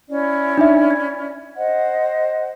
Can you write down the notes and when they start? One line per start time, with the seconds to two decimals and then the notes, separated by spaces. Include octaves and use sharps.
0.09 C#4 E4 D5
0.58 D4 D#4 E5
0.91 G#6
1.55 C5 D#5 F#5